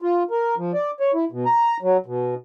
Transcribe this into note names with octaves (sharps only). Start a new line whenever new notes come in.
F4
A#4
F3
D5
C#5
E4
B2
A#5
F#3
B2